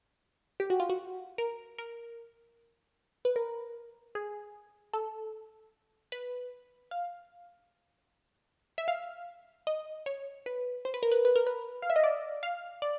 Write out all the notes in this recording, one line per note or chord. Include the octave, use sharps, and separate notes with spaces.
G4
F#4
F4
F#4
A#4
A#4
B4
A#4
G#4
A4
B4
F5
E5
F5
D#5
C#5
B4
C5
B4
A#4
B4
B4
A#4
B4
F5
E5
D#5
D5
F5
D5